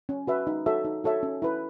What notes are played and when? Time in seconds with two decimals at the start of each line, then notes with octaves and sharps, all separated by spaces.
0.09 C#4
0.27 F#4 B4 E5
0.47 D#4
0.66 F#4 A4 C#5 E5
0.85 D#4
1.04 F#4 A4 C#5 E5
1.23 C#4
1.42 E4 B4